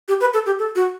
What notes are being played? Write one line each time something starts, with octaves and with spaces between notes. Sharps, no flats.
G4
B4
A4
G4
A4
F#4